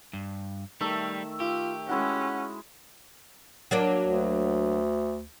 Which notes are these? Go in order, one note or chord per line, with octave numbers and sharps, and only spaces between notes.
G2
D#3 G3 A3 E5
F4 G4
G#3 C#4 E4 F#4 F#5
F#3 A#3 D4
D2